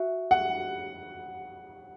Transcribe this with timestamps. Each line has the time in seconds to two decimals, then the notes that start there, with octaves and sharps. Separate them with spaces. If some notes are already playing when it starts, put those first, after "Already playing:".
Already playing: F#4 E5
0.31 F#5